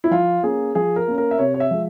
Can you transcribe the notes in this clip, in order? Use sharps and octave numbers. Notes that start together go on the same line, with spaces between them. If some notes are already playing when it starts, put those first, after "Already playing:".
E4
F3 F4
A#3 C#4 G#4
F3 G#4
A#4
A#3 C#4
A#4
E5
C3 C#5
C#5
E5
F3 G#3